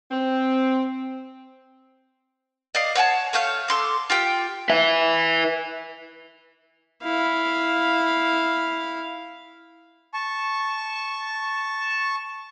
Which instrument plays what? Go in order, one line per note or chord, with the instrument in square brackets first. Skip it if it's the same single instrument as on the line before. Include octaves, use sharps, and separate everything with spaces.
[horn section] C4
[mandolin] D5 D#5 F5
C#5 F#5 G#5 A5
A3 C#5 F5 G6
A4 C6 D6
F4 G4 G5
[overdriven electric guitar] B4 E5
[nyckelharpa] E4 F5
[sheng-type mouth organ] A5 C#6